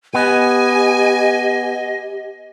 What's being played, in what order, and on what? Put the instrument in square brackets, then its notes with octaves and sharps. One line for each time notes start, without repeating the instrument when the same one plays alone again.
[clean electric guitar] B3 [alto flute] G4 [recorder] D#5 [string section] G#5